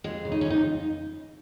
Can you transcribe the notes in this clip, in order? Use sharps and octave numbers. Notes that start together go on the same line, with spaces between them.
F2 G#3
C#3
D#4
C#4
F2 D#4